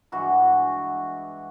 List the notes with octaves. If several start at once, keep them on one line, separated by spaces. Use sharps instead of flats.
G2 E3 G#3 F#4